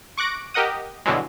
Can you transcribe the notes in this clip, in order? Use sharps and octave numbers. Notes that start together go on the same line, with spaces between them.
C#6 D6 F#6 A#6 D7
G4 A#4 D#5 F#5 D#6
G2 B2 D3 E3 F#3 G#3